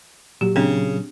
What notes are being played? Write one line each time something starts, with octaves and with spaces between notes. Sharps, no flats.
A#2 F#3 G4
C#3 C4 D4